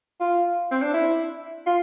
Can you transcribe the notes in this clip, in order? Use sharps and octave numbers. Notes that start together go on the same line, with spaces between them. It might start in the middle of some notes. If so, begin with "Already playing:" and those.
F4
C4
D4
E4
F4